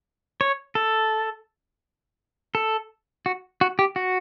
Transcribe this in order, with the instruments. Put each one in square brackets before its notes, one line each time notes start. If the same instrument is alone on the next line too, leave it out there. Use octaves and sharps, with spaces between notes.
[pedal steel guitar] C#5
A4
A4
F#4
F#4
G4
F#4